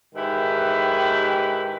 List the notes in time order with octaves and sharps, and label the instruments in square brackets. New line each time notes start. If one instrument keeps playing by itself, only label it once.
[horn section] G#2 D#3 E4 G4 B4